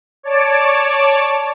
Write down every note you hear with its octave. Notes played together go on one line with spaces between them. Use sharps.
C#5 D5 A5 D6